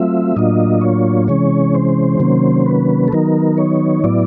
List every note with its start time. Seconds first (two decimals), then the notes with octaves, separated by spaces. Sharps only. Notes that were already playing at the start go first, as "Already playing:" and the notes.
Already playing: F#3 A3 C4 F4 E5
0.36 A2 F#3 A#3 D4 F4 D#5
0.81 C#5
1.28 C3 E3 G#3 C#4 C#5
1.75 C5
2.19 C3 D#3 F#3 A#3 C#4
2.66 B4
3.08 A4
3.12 D#3 F#3 B3 D#4 A#4
3.58 C#5
4.04 A2 F#3 B3 E4 D5